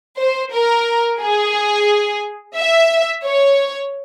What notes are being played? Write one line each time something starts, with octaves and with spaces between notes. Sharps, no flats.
C5
A#4
G#4
E5
C#5